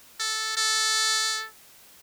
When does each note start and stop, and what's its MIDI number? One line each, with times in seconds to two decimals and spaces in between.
0.20 0.55 69
0.57 1.46 69